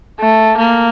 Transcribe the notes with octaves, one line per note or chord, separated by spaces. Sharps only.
A3
A#3